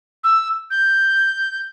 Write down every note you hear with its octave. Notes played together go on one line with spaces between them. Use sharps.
E6
G6